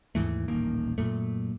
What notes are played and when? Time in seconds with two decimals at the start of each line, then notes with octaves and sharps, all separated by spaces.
0.15 D#2 G#2 E3 A3
0.48 D#1 A1 D#3 A#3
0.98 F#2 A#2 A3